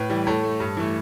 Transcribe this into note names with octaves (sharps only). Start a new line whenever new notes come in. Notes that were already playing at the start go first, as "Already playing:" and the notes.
Already playing: A2 B4
E3 G3
A2 A4
A3
G2
E3 A3